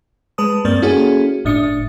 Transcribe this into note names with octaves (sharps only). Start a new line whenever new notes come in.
G#3 B4 A5 D#6
G2 A#3 C4 D5 A6
A#3 C#4 E4 F#4 G#4 A4
G1 A2 D4 D#6 C#7